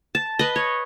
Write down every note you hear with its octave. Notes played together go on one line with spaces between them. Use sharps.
A5
B4 D#5
C#5